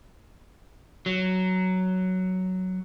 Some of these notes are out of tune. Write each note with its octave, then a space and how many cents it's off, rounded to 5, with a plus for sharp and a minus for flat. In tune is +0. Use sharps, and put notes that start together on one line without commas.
F#3 +5